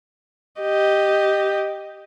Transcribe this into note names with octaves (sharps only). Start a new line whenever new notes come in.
G4 D#5